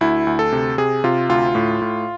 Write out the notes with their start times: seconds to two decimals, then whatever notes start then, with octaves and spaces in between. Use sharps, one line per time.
0.01 D2 E4
0.27 D2
0.39 A4
0.52 C3
0.78 C3 G#4
1.04 C3 F4
1.29 D2 F4
1.55 A2
1.82 A2